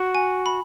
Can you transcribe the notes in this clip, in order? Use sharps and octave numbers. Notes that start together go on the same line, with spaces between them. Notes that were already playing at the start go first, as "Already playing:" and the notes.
Already playing: F#4
G#5
B5